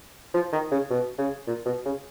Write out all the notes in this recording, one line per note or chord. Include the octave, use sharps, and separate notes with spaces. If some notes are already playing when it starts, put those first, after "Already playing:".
F3
D#3
C#3
B2
C#3
A#2
B2
C#3